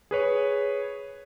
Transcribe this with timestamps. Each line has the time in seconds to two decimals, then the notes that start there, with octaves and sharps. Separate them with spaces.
0.11 G#4 B4 C#5